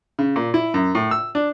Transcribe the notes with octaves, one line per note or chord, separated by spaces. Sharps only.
C#3
A#2
E4
F#2
A2
E6
D4